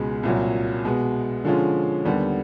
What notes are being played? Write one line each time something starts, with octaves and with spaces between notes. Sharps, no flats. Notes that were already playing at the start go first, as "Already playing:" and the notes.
Already playing: C#2 B2 G#3
C2 A#2 F#3
B2 G#3 B3
D3 F3 G#3 C#4 F4
D#2 D3 G3 B3